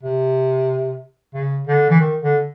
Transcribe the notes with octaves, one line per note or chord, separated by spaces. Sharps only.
C3
C#3
D3
E3
D#3
D3